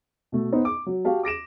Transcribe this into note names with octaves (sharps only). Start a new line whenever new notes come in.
B2 A3
B3 D#4 C5
D6
F#3
F#4 G4 F5 A5
D6 A#6 D7 E7